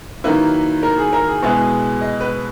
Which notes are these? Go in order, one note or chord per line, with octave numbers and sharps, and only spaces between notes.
D#3 F#3 A#3 E4 B4
A#4
G#4
A#4
G#4
B2 G#3 B3 E4 G#4
D#5
B4